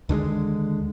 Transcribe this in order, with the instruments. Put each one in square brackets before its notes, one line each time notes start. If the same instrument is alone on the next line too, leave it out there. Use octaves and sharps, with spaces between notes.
[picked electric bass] D#2 D3 G3 G#3